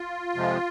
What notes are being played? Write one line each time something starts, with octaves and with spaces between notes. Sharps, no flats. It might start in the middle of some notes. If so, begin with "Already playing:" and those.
Already playing: F4
F2 C3 F3 G#3